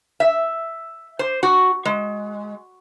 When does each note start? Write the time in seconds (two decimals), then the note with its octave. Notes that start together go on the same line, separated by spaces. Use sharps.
0.20 E5
1.19 C5
1.43 F#4
1.85 G#3